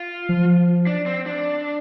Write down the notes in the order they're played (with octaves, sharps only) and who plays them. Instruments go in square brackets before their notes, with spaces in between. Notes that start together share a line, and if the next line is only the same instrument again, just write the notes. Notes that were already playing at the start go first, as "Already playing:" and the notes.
Already playing: [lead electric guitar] F4
[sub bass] F3
[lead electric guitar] D4
C4
D4